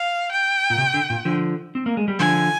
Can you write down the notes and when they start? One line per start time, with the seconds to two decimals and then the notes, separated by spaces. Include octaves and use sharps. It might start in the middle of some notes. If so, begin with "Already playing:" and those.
Already playing: F5
0.32 G5
0.70 A#2
0.78 C3
0.94 D3
1.10 A#2
1.25 D3 F3
1.75 C4
1.86 A#3
1.97 G#3
2.08 G3
2.19 D3 F3 G#5